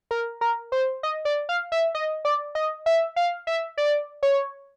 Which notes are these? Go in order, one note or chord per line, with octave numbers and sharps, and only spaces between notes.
A#4
A#4
C5
D#5
D5
F5
E5
D#5
D5
D#5
E5
F5
E5
D5
C#5